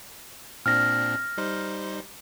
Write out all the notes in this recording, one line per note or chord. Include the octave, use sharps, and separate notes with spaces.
A#2 C4 D4 F6 A#6
G3 D#4 C5